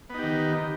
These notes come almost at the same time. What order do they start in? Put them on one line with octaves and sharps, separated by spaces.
B3 D#4 G4 D#3